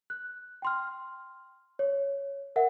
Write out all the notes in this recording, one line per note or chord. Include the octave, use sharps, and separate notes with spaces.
F#6
G5 C6 F6
C#5
A#4 E5 F#5